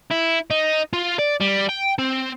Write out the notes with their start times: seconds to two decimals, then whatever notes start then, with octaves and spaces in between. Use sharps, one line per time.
0.11 E4
0.51 D#4
0.93 F4
1.19 D5
1.40 G3
1.69 G5
1.98 C4